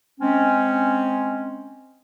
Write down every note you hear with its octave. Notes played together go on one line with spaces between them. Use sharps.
G#3 C4 C#4